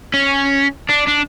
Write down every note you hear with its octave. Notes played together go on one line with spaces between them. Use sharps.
C#4
D4
D4